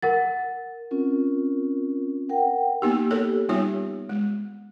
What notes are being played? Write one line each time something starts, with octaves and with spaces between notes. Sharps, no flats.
A#4 F#5 A6
C4 C#4 F4 A#4
A#4 F#5 G5
A#3 B3 D#4 G4
G4 A4 A#4 C#5
G3 B3 D#4 F4 G4 C#5
G#3